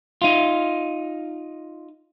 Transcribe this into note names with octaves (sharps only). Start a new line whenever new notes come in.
D#4 F4